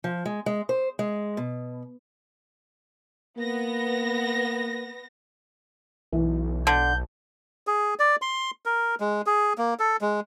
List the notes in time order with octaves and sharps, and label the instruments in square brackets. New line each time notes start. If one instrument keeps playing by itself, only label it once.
[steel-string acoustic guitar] F3
G#3
G#3
C5
G#3
B2
[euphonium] A#3 [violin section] B3 A#6
[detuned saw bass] B1 [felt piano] E3
[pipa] D3 [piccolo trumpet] G6
[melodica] G#4
D5
C6
A#4
G#3
G#4
A#3
A4
G#3